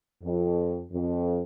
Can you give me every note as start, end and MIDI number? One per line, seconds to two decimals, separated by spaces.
0.23 0.83 41
0.92 1.42 41